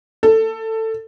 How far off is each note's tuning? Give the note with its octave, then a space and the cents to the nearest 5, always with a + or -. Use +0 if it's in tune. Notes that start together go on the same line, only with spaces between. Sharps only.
A4 +15